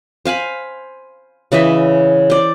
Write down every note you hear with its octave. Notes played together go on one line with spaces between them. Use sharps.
C5 F5 G#5 B5
C#3 E3 D#5 E5
C5 D5